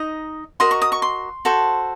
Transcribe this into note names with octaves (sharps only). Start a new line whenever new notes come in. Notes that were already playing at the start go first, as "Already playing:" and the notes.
Already playing: D#4 D#5
F#4 A#4 D#5 C6
C#6
D#6
C#6
C6
F#4 A4 C5